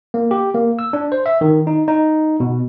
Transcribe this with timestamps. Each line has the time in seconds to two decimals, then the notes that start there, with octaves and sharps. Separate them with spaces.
0.14 A#3
0.31 G4
0.54 A#3
0.79 E6
0.93 D4
1.12 C5
1.26 E5
1.41 D#3
1.67 D#4
1.88 D#4
2.40 B2